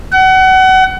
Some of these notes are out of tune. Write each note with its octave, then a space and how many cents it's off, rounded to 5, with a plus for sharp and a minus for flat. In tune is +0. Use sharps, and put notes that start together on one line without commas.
F#5 +30